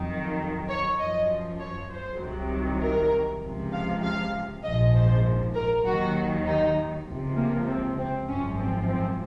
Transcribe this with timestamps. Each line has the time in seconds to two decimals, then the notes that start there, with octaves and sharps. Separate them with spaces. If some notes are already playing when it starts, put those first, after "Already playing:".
Already playing: F2 D#3 F#3
0.68 C#5
0.98 F#2 F3 D#5
1.59 C#5
1.90 C5
2.20 C2 C3 D#3 F#3
2.81 A#4
3.42 C#2 C3 F3
3.72 F5
4.02 F5
4.63 A#1 G#2 F3 D#5
4.93 C5
5.54 A#4
5.84 D#2 D#3 F#3 F#4
6.45 D#4
7.06 C#2 C3 F3
7.36 A#3
7.67 C4
7.97 C4
8.28 G#1 F#2 F3 C#4
8.58 C4
8.88 C4